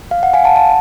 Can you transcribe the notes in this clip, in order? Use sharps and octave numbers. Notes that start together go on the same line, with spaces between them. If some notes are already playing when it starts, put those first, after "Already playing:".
F5
F#5
F5 G#5
F#5 A5
F#5 A5